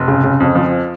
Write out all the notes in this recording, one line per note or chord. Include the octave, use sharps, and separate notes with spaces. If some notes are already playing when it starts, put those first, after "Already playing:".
Already playing: F1
C#3
C#3
F2
F3